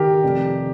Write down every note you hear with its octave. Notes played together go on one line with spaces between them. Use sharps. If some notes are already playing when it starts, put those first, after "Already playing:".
Already playing: D#3 G4 A#4
F1